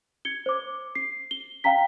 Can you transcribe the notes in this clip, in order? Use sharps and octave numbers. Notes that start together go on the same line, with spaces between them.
G#6 C#7 G7
C5 D6
C7
G7
F5 G5 A#5 B6